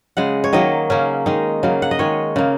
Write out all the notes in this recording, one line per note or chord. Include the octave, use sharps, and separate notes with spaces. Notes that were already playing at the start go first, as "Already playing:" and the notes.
C#3 G#3 F#5
C#5
D#3 F#3 A#3 D#5
C#3 A#3 C#4
D#3 G#3 D#4
C#3 F#3 A#3
F#5
D#5
D#3 G#3 C#5
C#3 A#3